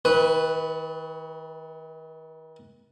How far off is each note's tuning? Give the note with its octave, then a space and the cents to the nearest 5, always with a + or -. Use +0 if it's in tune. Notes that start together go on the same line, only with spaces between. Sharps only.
D#3 +45 B4 +0